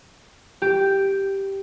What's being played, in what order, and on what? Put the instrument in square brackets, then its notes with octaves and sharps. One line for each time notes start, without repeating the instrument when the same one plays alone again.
[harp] G4